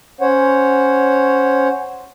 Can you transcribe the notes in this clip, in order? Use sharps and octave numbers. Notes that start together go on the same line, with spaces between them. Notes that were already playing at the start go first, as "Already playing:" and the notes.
C#4 C5 C#5 F#5